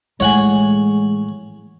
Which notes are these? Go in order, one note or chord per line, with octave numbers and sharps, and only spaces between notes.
A2 E3 G#3 C#5 F#5 G#5